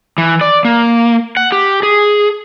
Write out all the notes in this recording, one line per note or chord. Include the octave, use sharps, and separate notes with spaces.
E3
D5
A#3
F#5
G4
G#4